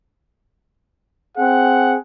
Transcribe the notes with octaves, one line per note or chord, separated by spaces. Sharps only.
C4 G#4 F#5